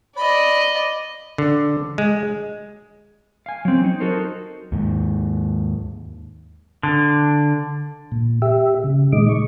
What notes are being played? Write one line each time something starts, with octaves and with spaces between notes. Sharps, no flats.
D5 D#5 B5
D3
G#3
F5 G#5
F#3 C4
D#4
D#4 F#4 A4 A#4 C5
D#2 G#2
D3
A#2
G4 E5
C#3
A#2 D#3 G#3 D#5 D6
C#6